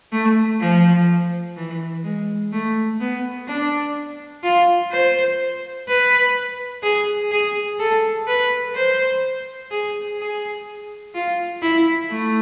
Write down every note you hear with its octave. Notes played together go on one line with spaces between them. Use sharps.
A3
F3
E3
G#3
A3
B3
D4
F4
C5
B4
G#4
G#4
A4
B4
C5
G#4
G#4
F4
E4
A3